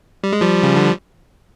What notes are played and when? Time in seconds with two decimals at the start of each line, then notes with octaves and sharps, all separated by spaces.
0.23 G3
0.33 G#3
0.41 F3 G3
0.63 C#3
0.77 D3